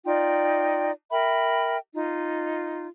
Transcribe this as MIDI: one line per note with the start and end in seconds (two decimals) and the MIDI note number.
0.04 0.91 63
0.04 0.91 65
0.04 0.91 74
0.04 0.91 79
1.10 1.76 70
1.10 1.76 76
1.10 1.76 79
1.10 1.76 83
1.93 2.88 63
1.93 2.88 65